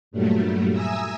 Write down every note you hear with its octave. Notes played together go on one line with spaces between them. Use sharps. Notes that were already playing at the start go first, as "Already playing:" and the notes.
G2 A#2 F#3 G3 A3
E5 G#5 A#5 D#6 E6